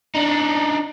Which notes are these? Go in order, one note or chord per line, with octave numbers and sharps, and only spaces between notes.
D4 D#4